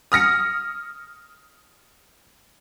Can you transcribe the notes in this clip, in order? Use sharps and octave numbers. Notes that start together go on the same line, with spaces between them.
D#6 F6 A#6 C#7